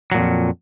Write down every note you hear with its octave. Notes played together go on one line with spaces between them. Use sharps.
F2 A#2 F#3